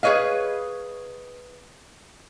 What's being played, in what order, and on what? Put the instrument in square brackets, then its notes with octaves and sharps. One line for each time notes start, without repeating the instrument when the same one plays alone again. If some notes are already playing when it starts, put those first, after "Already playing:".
[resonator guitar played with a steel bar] G#4 B4 C#5 D#5 F5